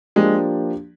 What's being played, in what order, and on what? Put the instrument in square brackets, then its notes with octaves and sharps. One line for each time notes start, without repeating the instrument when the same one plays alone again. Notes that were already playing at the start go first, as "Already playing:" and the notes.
[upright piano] F3 A#3 D4 G4 [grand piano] G#3